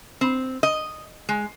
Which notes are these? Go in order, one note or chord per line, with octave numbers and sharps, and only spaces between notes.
C4
D#5
G#3